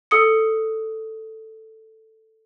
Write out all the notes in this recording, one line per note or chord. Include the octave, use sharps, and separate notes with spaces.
A4 D#6 C#7